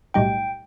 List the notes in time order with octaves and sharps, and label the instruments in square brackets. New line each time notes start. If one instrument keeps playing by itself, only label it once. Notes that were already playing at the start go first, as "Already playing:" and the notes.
[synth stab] B1 A2 G3 D#4 [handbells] G5